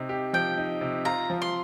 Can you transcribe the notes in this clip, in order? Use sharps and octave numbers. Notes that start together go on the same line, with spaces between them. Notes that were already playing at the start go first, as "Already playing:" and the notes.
Already playing: C3 D#4
G4
F3 G5
D#4
C3
F4 A#5
F3
C6